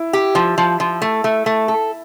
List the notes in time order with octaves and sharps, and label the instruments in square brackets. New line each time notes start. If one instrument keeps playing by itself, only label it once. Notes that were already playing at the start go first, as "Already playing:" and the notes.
Already playing: [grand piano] E4
[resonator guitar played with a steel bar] G4
F3
F3
F3
A3
A3
A3
A4